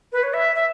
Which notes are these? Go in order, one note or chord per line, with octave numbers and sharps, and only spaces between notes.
B4
C#5
E5
E5